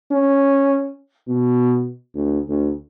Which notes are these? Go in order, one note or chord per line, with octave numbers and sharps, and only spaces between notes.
C#4
B2
D2
D2